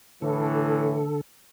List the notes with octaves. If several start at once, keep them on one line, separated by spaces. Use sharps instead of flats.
A2 D3 E3 A4